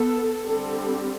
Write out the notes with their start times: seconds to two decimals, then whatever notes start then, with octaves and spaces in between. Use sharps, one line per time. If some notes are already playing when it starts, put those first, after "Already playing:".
Already playing: B3 A4
0.45 D3 G3 C4 A4